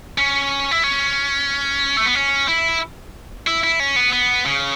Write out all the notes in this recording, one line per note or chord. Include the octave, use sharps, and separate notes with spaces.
C#4
E4
C#4
A3
B3
C#4
E4
E4
E4
C#4
B3
B3
C#3